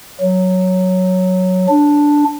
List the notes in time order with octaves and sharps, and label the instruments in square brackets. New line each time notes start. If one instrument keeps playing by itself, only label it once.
[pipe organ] F#3
D4